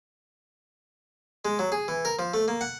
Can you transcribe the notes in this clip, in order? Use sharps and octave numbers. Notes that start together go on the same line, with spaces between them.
G#3
F#3
G#4
E3
A#4
F3
A3
A#3
F#5